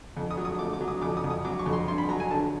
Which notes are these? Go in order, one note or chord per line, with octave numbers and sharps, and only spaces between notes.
F2
D#6
F#3
D#6
A3 D6
D6
F#3
D#6
F2 D6
D#6
F2
D#6
F#3 D6
C#6
F2
C6
G2 C6
B5
F#3 A#5
G#5
D3 A5